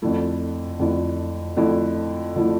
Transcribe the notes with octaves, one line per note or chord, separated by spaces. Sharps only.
F2 D3 F3 A3 E4
F2 D3 F3 A3 E4
F2 D3 F3 A3 E4
D3 F3 A3 E4